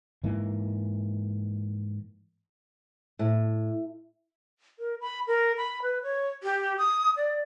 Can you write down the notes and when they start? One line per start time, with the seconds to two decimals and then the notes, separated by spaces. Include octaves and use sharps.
0.24 G#2 E3 A#3
3.19 A2
4.79 A#4
5.01 B5
5.27 A#4
5.57 B5
5.82 B4
6.03 C#5
6.43 G4
6.78 D#6
7.17 D5